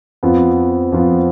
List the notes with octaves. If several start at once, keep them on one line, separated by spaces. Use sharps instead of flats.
F2 F3 B3 F4
F2 F3 B3 F4